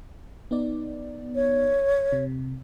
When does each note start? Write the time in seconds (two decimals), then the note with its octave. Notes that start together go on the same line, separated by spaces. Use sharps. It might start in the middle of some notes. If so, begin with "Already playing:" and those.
0.51 B3 D#4 D5
1.35 C#5
2.12 C3